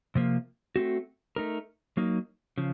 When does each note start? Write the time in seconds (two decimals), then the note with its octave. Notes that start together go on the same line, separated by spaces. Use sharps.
0.15 C3 F3 A#3
0.76 A3 C4 F#4
1.36 A3 D#4 A#4
1.97 F#3 A#3 D#4
2.58 C#3 F3